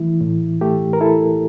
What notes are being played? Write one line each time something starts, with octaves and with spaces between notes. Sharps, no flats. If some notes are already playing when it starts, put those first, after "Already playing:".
Already playing: E3 A3 E4
A2
A3 G4
A#4
E4 A4